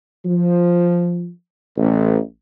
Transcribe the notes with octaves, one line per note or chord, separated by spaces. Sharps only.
F3
A1